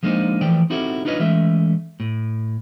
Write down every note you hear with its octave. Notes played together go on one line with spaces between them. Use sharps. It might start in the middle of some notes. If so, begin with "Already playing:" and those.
F3 G#3 A#3 D4 D#4 C5
E3 F3 A3 D5 G5
C4 D#4 E4 F#4 G4 A4
D4 D#4 F4 B4 C#5 D#5
E3 G#3 A3 C#4 E5
A2